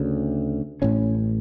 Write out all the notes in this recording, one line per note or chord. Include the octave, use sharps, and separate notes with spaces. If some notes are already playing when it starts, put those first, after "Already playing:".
Already playing: D2 C#3
A1 A2 C#4